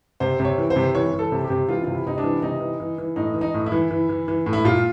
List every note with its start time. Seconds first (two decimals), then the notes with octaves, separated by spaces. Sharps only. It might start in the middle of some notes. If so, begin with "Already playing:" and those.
0.20 C3 C5
0.40 C3 C#5
0.58 E3
0.70 C5
0.76 C3
0.95 E3 C#5
1.14 E3
1.19 A4
1.32 C3
1.44 G4
1.50 C3
1.69 E3 F4
1.83 C3 F4
1.93 E4
2.06 C3 D#4
2.18 D4
2.24 E3
2.42 C3 D#4
2.60 E3
2.80 E3
2.98 E3
3.16 A2 D#4
3.35 E3
3.41 D#4
3.54 A2
3.66 E4
3.72 E3
3.91 E3
4.09 E3
4.28 E3
4.46 A2
4.53 E4
4.65 A#2 F4